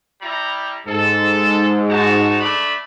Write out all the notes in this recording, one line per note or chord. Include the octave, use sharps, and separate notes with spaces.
G3 E4 A#5
G#2 A4
D#4 F#4 A5
A3 D4 B5